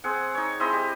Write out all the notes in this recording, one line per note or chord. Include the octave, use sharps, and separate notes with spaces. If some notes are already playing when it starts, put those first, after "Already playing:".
C4 G#4 F#5
D#4 C#5
G#3 C4 E4 D#5
G4